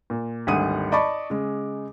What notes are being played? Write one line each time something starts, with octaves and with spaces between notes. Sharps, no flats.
A#2
G#1 D2 G3 F#5 D#6 D#7
D5 D#5 A5 B5 C#6 D6
C#3 G#3